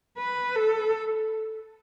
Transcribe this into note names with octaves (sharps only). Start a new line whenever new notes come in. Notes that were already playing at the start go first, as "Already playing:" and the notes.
B4
A4